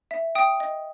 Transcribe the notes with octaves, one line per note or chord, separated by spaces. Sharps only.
E5
G5 D#6
D#5